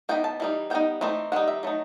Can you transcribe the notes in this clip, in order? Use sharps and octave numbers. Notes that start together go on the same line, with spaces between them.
E3 B3 D#4 G5
A5
E3 G3 D#4
G3 B3 D#4 G5
E3 A3 C4 D#4
D#3 G3 D#4 F#5
E5
F#3 A3 D#4